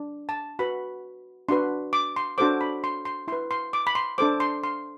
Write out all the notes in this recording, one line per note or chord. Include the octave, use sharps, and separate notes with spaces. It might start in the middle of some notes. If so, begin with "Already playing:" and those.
Already playing: D4
A5
F#4 B4 B5
D4 F#4 B4 C6
D6
C6
D4 F#4 A4 C5 D6
B5
C6
C6
E4 B4 C6
C6
D6
B5
C6
D4 A4 C5 D6
C6
C6